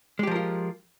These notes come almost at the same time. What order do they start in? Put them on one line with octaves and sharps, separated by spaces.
G#3 G4 F3 A#4 F4